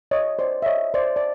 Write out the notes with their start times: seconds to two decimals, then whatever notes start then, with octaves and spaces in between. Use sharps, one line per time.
0.11 C#5 D#5
0.39 C5 D5
0.62 E5
0.66 C#5 D#5
0.94 C5 D5
1.16 D5